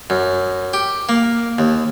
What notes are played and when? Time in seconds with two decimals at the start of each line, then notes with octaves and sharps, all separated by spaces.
0.10 F#2
0.73 G4
1.09 A#3
1.59 D#2